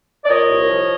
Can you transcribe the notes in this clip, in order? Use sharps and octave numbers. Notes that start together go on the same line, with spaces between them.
D5
A#2 C#5 D#5
C2
F3